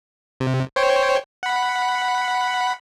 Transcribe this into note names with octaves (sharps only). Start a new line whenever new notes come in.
C3
C5 C#5 G5
F#5 B5